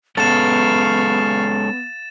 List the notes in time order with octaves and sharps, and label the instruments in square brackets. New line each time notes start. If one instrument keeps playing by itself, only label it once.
[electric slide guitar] G#3 C#4 A4 [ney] B3 [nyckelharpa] F5 C#6 [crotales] A6 E7